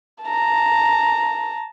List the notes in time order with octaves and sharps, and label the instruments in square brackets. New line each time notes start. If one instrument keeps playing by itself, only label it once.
[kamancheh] A5 A#5